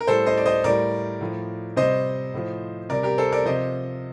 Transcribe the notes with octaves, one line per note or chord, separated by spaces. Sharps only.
A#4
A2 G3 A4 C5
C5 D#5
D5
C5 D#5
A2 G3 A#4 D5
A2 F3
C3 G3 C5 D#5
A2 F3
C3 G3 A#4 D5
G4 A#4
A4 C5
A#4 D5
C3 F3 C5 D#5